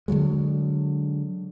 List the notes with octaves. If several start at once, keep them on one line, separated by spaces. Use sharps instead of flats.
D3 E3 F#3 G#3